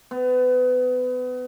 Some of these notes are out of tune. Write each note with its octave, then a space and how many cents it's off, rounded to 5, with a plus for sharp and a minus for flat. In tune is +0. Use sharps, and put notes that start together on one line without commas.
B3 +30